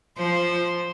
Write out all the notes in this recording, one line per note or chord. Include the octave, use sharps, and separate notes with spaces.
F3 C5